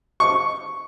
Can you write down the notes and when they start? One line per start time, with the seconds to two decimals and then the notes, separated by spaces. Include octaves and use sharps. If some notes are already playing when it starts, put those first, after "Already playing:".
0.20 C#6